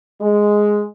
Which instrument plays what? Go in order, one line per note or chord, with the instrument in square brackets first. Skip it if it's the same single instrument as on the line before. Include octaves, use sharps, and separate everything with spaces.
[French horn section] G#3